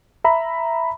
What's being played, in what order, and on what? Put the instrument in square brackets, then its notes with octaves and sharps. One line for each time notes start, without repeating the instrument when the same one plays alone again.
[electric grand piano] E5 A#5 B5